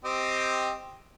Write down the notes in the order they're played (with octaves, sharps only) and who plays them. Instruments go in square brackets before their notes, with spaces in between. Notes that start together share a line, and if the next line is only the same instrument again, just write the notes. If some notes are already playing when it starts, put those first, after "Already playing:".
[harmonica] C4 G4 D#5